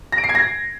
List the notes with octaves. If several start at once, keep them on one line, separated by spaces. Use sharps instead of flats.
A#6
D7
C7
G#6
A#6